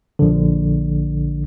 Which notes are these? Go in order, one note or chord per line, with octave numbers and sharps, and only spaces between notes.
A#1 D3